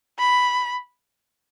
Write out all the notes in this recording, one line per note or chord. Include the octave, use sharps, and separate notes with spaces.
B5